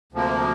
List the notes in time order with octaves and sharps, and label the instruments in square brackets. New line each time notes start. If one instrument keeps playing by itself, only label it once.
[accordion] D2 C3 F3 A#3